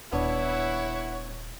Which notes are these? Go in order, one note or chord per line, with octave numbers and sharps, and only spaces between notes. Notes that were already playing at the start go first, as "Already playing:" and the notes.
D#1 B3 D4 E4 C#5 F#5